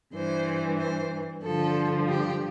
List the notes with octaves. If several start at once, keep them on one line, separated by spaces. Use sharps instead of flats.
G2 E3 C5
C5
G2 D3 F3 A4
G4